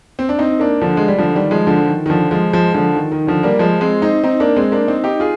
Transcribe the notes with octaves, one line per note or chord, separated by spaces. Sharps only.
C4
D4
C4 D#4
A#3 D4
D3 F3
G#3
G3
D3 F3
D#3 G3
F3 G#3
D3 F3
D#3
D#3
D3 F3
F3 G#3
F3 G#3
D3 F3
D#3
D#3
D3 F3
G3 A#3
F3 G#3
G#3 C4
C4 D#4
C4 D#4
A#3 D4
G#3 C4
A#3 D4
C4 D#4
D#4 G4
F4 G#4